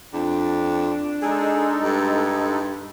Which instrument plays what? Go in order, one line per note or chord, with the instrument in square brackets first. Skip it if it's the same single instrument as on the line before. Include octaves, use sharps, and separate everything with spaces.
[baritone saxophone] F2 [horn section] D4
[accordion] G#3 D#4 A4 [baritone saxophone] G#4
[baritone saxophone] G2